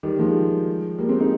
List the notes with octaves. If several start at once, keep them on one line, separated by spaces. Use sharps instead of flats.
D#3 G3
F3 G#3
G3 A#3
G#3 C4
C4 D#4